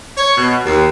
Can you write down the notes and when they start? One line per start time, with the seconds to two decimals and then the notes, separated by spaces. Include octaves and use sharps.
0.18 C#5
0.37 B2
0.66 D#2